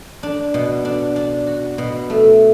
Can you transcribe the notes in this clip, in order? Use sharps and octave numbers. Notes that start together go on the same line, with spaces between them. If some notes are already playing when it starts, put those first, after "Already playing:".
D4
B2
D4
D4
F#4
B2
A3